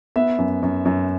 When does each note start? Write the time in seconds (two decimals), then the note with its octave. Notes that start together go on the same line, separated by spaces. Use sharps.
0.16 B3 E5
0.38 F#2
0.63 F#2
0.85 F#2